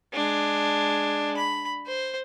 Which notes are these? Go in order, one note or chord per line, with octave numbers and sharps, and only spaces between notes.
G#3 D4
B5
C5